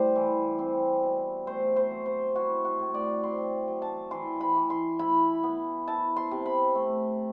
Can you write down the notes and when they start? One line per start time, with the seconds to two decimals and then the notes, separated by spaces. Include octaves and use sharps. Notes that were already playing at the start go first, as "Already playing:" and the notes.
Already playing: A2 G3 C5
0.16 E3
0.59 C4
1.03 B2
1.47 A3 C5
1.76 C5
1.91 F#3
2.06 C5
2.35 E4 F#4
2.65 F#4
2.79 A2
2.94 D5
3.23 C4 C6
3.68 F#3
3.82 A5
4.11 E3 C6
4.41 B5
4.56 E3
4.70 C6
4.99 E4 B5
5.43 B3
5.88 E4 A5
6.16 C6
6.31 C3
6.46 B5
6.75 A3